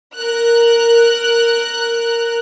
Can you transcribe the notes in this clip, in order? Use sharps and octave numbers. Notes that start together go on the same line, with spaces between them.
A#4 F#6